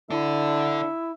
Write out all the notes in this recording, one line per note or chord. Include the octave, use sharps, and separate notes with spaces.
D3 D4 E4 A4 E5